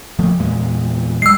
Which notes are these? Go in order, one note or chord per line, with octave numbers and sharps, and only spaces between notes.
F3 A3 A#3
E2 A#2 G#3
G3 G#3 E6 C7